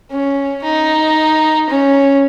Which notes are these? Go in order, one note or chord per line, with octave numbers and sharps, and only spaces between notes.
C#4
D#4
C#4